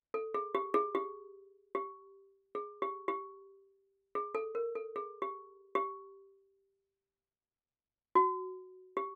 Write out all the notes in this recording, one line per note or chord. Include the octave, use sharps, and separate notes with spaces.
A4
G#4
G4
G#4
G4
G4
G#4
G4
G4
G#4
A4
A#4
A4
G#4
G4
G4
F#4
G4